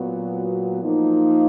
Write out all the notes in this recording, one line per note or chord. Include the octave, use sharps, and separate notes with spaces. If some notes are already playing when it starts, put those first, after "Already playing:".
Already playing: A#2 F#3 B3 F#4
F3 A#3 D#4